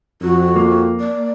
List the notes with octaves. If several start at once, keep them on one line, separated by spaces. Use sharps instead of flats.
F2 F#4
A#3
D5